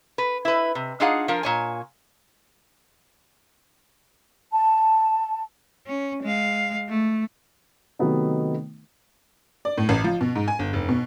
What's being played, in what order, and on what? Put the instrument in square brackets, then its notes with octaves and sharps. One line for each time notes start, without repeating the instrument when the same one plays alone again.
[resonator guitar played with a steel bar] B4
E4 B4
C3
D4 D#4 F4 G#4 F5 F#5
F3 F4 A#4
A#2 C#5 G#5
[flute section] A5
[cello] C#4
G#3 F5
A3
[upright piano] C3 D#3 F#3 A3 B3 D#4
[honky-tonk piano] D5
A2
A1
F3
B2
G#2
G#5
G1
F1
B2